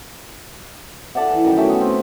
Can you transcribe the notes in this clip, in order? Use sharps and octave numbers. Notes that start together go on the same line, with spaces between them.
A4 D5 E5 F#5
E3
F#2 D#3 G3 G5
A3 C#4 E5 G5
B3
C4